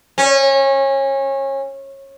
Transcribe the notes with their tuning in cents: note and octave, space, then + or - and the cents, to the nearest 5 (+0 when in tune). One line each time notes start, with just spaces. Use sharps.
C#4 -25